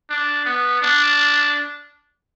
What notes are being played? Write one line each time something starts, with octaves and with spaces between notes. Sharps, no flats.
D4
B3
D4